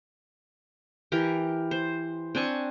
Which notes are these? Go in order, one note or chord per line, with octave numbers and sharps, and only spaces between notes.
E3 G4 A#4
C5
C4 D4 G#5 C#6